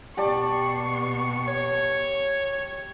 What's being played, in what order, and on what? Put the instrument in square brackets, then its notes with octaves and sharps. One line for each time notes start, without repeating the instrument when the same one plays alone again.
[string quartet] B2 C#6 [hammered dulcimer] G4 D5 A5
[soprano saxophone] C#5